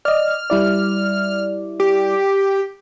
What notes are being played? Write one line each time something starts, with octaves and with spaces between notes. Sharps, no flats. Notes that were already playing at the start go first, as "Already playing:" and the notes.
D5 D#5 F6
G3 E4 D5
G4